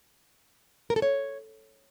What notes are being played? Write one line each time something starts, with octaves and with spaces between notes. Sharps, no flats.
A#4
A4
C#5